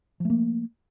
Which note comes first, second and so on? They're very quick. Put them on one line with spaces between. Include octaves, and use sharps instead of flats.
F3 A3 A#3